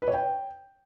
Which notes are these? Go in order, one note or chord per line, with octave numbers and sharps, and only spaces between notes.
B4
C#5
G5